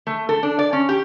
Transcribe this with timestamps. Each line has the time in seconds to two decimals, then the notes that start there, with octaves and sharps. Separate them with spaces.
0.07 A3
0.29 A4
0.43 D4
0.59 D5
0.73 C#4
0.89 G4